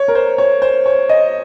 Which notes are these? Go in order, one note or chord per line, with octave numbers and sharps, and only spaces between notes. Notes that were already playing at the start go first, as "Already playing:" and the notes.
Already playing: C#5
A#4
C5
C#5
C5
C#5
D#5